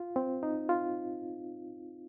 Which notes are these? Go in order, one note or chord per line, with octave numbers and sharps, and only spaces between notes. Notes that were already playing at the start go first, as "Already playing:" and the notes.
Already playing: F4
C4
D#4
F4